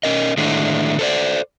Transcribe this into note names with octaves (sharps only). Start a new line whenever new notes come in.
C#4 A#4 D#5
A2 D3 D#3 G#3 A3 D4
A4 C5 D5